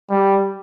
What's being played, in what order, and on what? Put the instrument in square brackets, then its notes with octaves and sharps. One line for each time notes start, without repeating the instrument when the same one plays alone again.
[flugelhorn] G3